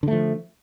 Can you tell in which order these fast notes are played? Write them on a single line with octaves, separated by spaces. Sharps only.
D3 A3 F3